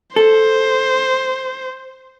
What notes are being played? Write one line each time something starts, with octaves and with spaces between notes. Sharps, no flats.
A4 C5